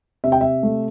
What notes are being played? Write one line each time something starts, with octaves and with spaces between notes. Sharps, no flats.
C3 E5
G5
E5
A3